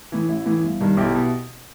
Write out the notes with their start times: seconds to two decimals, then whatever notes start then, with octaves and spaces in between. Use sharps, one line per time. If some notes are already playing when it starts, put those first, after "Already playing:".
0.12 A2 E3
0.28 A1 E4
0.46 A2 E3
0.63 G1
0.81 G2 D#3
0.97 B1 E4 G4
1.15 B2